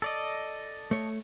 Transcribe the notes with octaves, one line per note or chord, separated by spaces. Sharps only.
A4 D5 D#5
A3 C#5